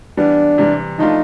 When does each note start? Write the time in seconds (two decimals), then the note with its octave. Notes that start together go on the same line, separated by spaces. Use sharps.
0.17 E3 G3 B3 D4
0.58 C3 E3 G3
0.99 F3 A3 D4 D#4 F4